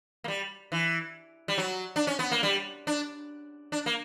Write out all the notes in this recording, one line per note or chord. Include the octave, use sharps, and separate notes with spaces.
A#3
G3
E3
G3
F#3
D4
C#4
B3
A#3
G3
D4
D4
A#3